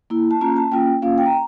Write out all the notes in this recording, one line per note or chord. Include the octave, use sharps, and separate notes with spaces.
A#3 E4
A5
A#3 C#4 F4 A#5
A5
A#3 C#4 F4 G5
A#3 C#4 F4 F5
G5
A#5